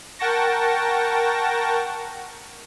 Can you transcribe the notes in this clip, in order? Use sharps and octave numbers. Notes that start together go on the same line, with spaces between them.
A#4 F#5 G5 A5 C#6 A#6